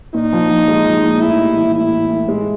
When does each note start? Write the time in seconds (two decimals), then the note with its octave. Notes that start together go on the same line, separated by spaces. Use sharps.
0.14 A#2 D#4
0.33 F3
0.50 F3
0.68 G#3
0.86 F3
1.03 A#2
1.22 A2 E4
1.39 G3
1.57 E3
1.75 A2 E4
1.93 A2
2.11 A2
2.29 G#3